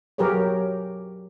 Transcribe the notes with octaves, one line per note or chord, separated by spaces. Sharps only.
F#3 G4 G#4 A#4 B4 C#5